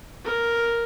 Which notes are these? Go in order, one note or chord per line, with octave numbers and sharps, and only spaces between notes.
A#4